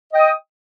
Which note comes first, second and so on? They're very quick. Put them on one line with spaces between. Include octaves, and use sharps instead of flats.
D#5 G5 D#6